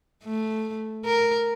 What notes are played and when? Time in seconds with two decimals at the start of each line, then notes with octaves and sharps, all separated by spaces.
0.25 A3
1.05 A#4